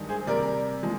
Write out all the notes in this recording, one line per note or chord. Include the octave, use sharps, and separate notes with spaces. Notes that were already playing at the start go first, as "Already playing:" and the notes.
Already playing: G2 D#3 G#3
G#4 C5
C3 G3 A#4 D5
F3 G#3